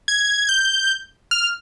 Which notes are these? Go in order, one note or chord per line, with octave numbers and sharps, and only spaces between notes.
G#6
G6
F6